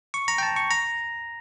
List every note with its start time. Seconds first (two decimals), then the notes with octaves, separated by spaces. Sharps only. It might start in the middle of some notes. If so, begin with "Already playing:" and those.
0.14 C#6
0.28 A#5
0.38 G5
0.43 A5
0.56 C#6
0.71 A#5